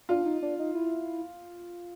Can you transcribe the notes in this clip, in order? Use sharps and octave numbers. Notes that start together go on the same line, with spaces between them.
D4 F4
D#4
D4
D#4
E4